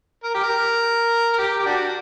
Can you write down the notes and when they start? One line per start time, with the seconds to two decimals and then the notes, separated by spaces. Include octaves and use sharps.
0.24 A#4
0.34 G4
0.43 A#4
1.33 A#4
1.38 G4
1.60 G4
1.66 D4 F#4